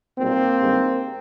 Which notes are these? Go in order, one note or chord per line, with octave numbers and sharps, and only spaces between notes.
B1 A#2 G3 A#3 C4
G2 D#3 G#3